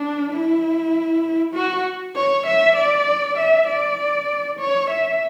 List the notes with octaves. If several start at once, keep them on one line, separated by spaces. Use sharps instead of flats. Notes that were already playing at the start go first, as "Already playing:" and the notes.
Already playing: D4
E4
F#4
C#5
E5
D5
E5
D5
C#5
E5